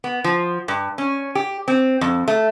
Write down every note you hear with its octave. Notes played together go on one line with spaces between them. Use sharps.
B3
F3
G2
C#4
G4
C4
F2
A3